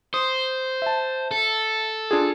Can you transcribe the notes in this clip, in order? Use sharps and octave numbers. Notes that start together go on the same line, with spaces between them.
C5 D#6
E5 A5
A4
D4 F4 G#4